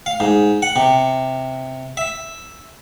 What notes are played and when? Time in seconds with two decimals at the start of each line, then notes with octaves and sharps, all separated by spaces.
0.06 F5
0.20 G#2
0.62 F#5
0.76 C3
1.97 E5